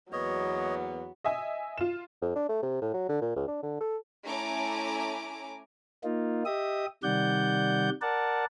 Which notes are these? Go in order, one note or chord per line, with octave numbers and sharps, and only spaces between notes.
E2 F#3 A#3 B3 C#5 D#5
D#5 E5 G#5
F4 E7
F2
D4
A3
C3
A2
F#3
D3
A#2
C#2
D4
D3
A4
A3 C#4 E4 G#5 A#5 D6
A#3 D#4 F4
G4 D#5 E5 D#6
C3 D#3 G3 D5 F#5 G6
A#4 D5 F#5 A5